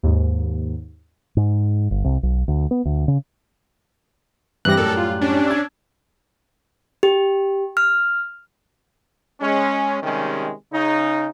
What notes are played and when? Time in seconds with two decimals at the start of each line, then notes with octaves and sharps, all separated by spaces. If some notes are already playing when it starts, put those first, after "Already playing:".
0.03 D#2 G#2
1.37 G#2
1.91 G1
2.04 C2
2.23 B1
2.48 D2
2.71 B3
2.85 D2
3.08 C#3
4.65 G2 E3 G3 C4 G4 F#6 A#6
4.77 F#2 A2 G3 A4 A#4
4.97 F4
5.21 C#4 D4
5.46 E6 G#6
7.03 G4
7.77 F6
9.41 G#3 C#4
10.03 C3 D#3 G3 G#3 C#4
10.72 C#3 D#4